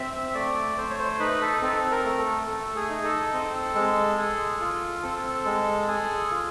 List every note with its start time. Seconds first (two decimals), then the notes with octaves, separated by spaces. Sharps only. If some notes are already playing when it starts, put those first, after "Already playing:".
Already playing: C4 E5
0.35 A3 D5
0.77 A3 C5
0.90 C#5
0.99 C5
1.19 D#4 B4
1.42 A4
1.62 C4 A4
1.91 A#4
2.05 A3
2.18 A4
2.47 A3 A4
2.76 G#4
2.89 D#4
3.04 A4
3.33 C4
3.75 G#3
4.18 G#4
4.61 F4
5.03 C4 A4
5.45 G#3
5.88 G#4
6.31 F4